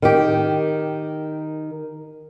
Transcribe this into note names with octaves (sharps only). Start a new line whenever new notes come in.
D#3 G4